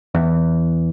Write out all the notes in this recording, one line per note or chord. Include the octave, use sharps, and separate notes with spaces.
E2